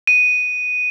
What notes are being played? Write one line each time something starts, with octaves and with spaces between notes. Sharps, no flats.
D#7